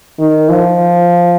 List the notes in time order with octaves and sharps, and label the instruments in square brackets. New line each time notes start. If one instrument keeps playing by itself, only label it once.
[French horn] D#3
F3